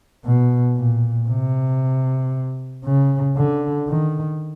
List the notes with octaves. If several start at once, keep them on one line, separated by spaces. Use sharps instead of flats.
B2
A#2
C3
C#3
D3
D#3